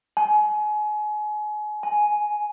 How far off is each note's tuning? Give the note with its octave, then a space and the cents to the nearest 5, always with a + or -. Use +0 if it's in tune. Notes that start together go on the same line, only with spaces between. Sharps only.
G#5 +30
G#5 +10